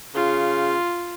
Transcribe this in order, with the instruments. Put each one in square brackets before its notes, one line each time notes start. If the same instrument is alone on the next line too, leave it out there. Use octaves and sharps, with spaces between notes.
[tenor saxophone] C#3 [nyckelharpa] F4